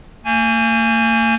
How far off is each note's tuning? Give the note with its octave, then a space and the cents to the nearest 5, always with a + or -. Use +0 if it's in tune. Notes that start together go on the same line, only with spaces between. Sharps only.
A#3 -45 G#5 +0